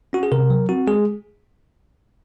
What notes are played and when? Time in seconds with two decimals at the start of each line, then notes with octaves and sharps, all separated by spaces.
0.13 C#4 F#4
0.23 G#4
0.32 C3 A#4
0.50 F#3
0.69 C4 F#4
0.87 G#3 G#4